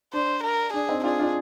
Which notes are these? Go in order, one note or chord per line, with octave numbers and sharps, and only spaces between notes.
D4 C5
A#4
D4 G#4
C4 D#4
D4 F4 G#4
D4 F4